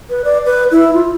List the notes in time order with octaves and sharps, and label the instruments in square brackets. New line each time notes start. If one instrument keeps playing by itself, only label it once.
[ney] B4
D5
B4
E4
F4